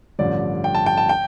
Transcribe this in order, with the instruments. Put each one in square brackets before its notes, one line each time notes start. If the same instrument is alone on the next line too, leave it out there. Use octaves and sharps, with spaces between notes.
[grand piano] A1 G2 D3 F3 D5
G5
A5
G5
A5
G5